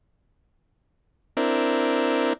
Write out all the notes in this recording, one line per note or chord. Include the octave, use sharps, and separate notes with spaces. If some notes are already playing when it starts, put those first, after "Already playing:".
C4 D4 E4 A#4